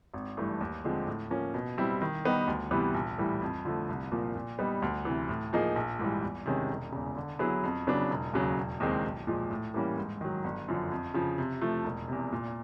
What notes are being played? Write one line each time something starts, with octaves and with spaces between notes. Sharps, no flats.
G#1
G2 E3 A3
D#2
D3 F3 G#3 C4
A2
F3 A#3 C#4
B2
G3 C4 E4
D#3
G3 B3 D#4 G4
D2
C3 E3 G3 B3
A#1
A2 E3 G3
F2
D3 F3 A3
C2
A#2 F3 A#3
A#2
G3 B3 D#4
D2
C3 E3
A2
F3 A#3 D#4 G#4
A#1
G#2 E3 G3
E2
C3 D#3 G#3 C#4
E1
E2 C#3
D3
F#3 B3 E4 G#4
F2
C#3 F#3 B3 D4
E1
D#2 C#3 F#3
E1
D#2 D#3 G#3 C4
B1
A#2 F3 G#3
A2
E3 G3 A#3 C#4
G#2
D#3 F#3
G1
F#2 D3 F3
F2
C#3 F3
C3
F3 A3
E1
E2 C3
A#2